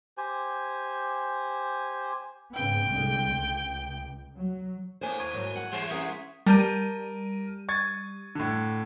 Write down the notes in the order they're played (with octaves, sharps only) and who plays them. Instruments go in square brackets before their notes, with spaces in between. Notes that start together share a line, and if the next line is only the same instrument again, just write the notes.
[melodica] G4 C5 G#5
[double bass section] G#2 C#3 B3 [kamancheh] G5
[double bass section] C2 D3 G#3
C#2
F#3
[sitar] A2 A3 A#3 [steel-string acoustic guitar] C5 C#5 G#5
[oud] D#2 [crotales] C#6 G#6 D#7
[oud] G#2 D#3 F#3
[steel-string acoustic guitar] F#5
[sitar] E2 G3 C5 [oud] C#5
[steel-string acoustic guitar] C#4 F#5 [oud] A#4 [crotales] D#6 B6
[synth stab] G3 D#7 [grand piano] A#4 A5 G6
[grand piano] C#6 G#6 A6
A2 D3